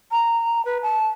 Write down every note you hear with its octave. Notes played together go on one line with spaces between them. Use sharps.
A#5
B4
A5